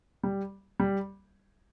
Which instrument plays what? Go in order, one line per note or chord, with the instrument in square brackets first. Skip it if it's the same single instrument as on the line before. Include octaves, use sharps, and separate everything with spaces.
[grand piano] G3
G3